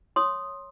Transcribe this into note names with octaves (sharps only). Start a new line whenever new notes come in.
C#5 C6 D#6